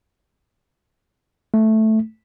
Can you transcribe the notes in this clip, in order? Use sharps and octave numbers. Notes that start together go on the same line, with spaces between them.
A3